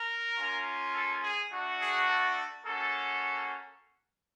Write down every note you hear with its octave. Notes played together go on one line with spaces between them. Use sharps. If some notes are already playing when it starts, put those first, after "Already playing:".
Already playing: A#4
A#3 C#4 F4
A4
G#4
A3 D4 F#4
G#4
A4
A#3 C#4 F#4 A4